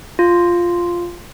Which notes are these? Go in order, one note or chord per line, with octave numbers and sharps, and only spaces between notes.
F4